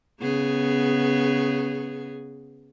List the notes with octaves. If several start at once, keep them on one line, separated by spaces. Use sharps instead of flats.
C#3 B3 G#4